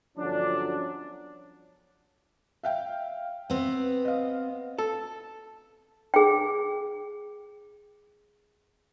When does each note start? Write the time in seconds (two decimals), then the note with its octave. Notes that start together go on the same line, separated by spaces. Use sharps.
0.18 G1 F3 F#3 C#4 D4
2.63 E5 F5 G5
3.50 B3 C4
4.05 D#5 F5
4.78 A4
6.14 G#4 G5